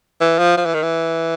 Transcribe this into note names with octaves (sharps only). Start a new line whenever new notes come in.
E3
F3
F3
E3
D#3
E3